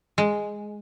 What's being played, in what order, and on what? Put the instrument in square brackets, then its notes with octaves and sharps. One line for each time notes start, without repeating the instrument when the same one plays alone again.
[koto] G#3